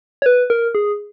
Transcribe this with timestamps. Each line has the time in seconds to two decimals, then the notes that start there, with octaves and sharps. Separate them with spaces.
0.22 C#5
0.26 B4
0.50 A#4
0.75 G#4